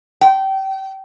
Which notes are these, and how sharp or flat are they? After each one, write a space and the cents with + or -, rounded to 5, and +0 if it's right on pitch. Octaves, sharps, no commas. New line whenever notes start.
G5 -25